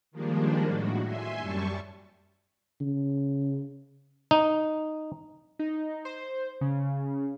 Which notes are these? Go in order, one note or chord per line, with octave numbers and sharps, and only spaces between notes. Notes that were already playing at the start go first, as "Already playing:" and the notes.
D#3 F3 G3 G#3 A#3 D4
A2 F#4
E5 G#5 C6
F#2 G3 A5 C#6
C#3
D#4
D#4
C5
C#3